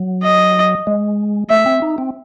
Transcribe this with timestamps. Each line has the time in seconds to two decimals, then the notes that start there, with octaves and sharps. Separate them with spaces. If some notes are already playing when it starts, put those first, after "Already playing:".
Already playing: F#3
0.24 D#5
0.87 G#3
1.50 A3 E5
1.66 C4
1.82 D#4
1.98 C4